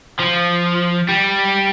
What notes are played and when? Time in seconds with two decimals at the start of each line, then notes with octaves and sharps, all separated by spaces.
0.20 F3
1.09 G3